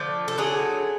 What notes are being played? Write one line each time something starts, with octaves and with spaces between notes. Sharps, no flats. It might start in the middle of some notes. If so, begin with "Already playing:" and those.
Already playing: D3 F3 A3
A4
D3 F#3 A3 G#4